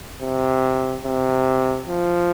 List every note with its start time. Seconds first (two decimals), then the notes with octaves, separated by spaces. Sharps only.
0.21 C3
1.04 C3
1.87 F3